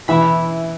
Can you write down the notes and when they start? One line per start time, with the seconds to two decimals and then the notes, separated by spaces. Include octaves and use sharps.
0.08 E3 E4 A4 E5 B5